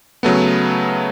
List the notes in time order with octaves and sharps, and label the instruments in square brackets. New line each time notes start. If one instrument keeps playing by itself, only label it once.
[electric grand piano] C#3 F#3 A3 B3